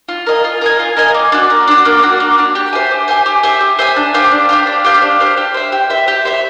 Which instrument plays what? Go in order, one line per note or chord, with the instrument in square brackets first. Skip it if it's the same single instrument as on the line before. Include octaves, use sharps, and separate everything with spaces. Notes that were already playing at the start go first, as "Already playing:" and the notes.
[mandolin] F4
A#4 D#5 G#5
F4
A#4 D#5 G#5
F4
A#4 D#5 G#5
A#3
D4 F#4
A#3
D4 F#4
A#3
D4 F#4
A#3
D4 F#4
G4
C5 E5 G#5
G4
C5 E5 G#5
G4
C5 E5 G#5
G4
C5 E5 G#5
D4
G4 C5 F5
D4
G4 C5 F5
D4
G4 C5 F5
D4
G4 C5 F5
G4
C5 E5
G4
C5 E5
G4
C5 E5